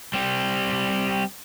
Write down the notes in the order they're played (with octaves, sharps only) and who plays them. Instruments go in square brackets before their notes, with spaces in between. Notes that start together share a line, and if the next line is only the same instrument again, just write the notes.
[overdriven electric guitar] G3 C4